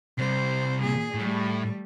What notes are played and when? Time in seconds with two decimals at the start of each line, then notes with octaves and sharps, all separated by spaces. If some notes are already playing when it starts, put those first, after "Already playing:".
0.19 C3 G3 C5
0.81 A#2 G#4
1.15 A2 G3 A3